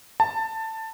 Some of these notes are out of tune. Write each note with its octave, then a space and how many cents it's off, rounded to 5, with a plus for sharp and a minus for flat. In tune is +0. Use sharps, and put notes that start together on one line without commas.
A5 +15